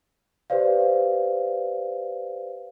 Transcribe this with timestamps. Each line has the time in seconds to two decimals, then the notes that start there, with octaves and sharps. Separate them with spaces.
0.50 G4 B4 C5 D5 F5